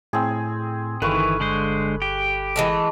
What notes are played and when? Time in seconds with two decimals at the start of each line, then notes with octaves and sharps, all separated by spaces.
0.13 A2 C4 G#4
1.02 G1 D#3 E3 A4 B4 F5 C#6
1.40 D3 G#3 C5
2.02 G4
2.56 E3 G#3 A3